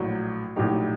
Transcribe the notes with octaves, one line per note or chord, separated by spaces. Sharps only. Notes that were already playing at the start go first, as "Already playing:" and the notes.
Already playing: A#1 A2 F#3
A#1 A2 F#3 D#4 G4